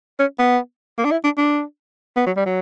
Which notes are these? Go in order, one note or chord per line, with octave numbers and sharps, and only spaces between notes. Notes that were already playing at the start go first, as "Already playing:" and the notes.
C#4
B3
A#3
D4
E4
D4
D4
B3
F#3
G3
F#3